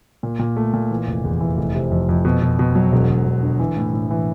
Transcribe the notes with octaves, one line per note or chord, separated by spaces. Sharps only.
A#2
A#2
A3
A#2
E3
F1
E2
E3
F1
C3
F2
F2
B2
B2
B2
F#3
E1
E1
E1
D3
E3
A2
A2
E3